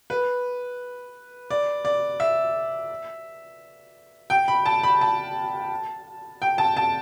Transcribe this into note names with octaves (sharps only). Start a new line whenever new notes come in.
B4
D5
D5
E5
G5
B5
A5
B5
A5
G5
A5
A5